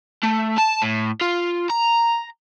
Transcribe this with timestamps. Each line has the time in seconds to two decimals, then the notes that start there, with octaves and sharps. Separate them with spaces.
0.23 A3
0.58 A5
0.82 A2
1.21 F4
1.70 A#5